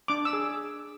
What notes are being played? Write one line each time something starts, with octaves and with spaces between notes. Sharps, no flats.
D4 D6
E6
G#4